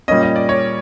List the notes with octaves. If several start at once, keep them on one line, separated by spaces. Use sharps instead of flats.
A#2 G3 A#3 C#4 D#5
D#5
D5
C#5